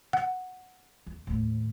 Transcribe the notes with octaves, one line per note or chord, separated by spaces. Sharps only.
F#5
E2
D#2 A2